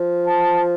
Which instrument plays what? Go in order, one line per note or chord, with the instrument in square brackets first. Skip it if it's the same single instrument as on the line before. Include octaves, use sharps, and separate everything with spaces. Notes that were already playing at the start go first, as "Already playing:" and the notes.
Already playing: [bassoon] F3
[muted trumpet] A5